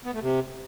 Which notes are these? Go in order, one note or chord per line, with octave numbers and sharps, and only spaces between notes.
B3
A3
C3